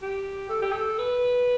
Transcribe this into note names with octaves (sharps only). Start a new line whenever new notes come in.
G4
A4
G4
A4
B4